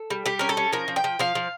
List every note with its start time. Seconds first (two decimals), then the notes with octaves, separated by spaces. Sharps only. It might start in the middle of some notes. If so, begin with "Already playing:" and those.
Already playing: A4
0.10 G3
0.26 G3 G4
0.39 C#4 A#4
0.49 A4
0.57 C#4
0.73 F3 A#4
0.88 F3
0.96 G5
1.04 F3
1.19 F3 F5
1.35 F3